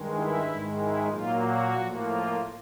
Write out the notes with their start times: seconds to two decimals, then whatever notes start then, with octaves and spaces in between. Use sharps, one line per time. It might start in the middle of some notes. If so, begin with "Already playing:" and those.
Already playing: G2 D#3 G#3
0.12 E4
0.44 G#2 D#3 G#3
0.77 E4
1.09 A#2 F#3 A#3 F4
1.42 F#4
1.74 A2 F3 A#3
2.06 F4